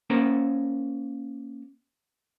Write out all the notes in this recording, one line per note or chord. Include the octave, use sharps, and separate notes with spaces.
A#3 C#4 A#4 C5